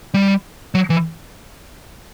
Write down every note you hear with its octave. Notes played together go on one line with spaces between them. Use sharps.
G3
F#3
E3